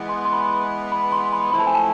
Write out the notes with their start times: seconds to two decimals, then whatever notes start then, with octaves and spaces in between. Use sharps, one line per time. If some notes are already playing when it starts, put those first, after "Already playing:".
Already playing: E3 G#3 B3
0.09 C6
0.25 C6
0.33 B5
0.92 B5
1.12 C6
1.33 B5
1.52 F3 A3 C4 E4 B5
1.59 A5
1.67 G#5
1.75 A5